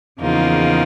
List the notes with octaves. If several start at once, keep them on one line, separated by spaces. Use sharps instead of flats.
E2 C#3 F3 A#3 D#4